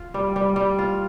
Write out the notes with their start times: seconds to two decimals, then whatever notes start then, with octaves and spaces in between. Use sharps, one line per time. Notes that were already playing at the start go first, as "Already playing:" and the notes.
Already playing: F4
0.14 G3
0.36 G3
0.56 G3
0.79 F4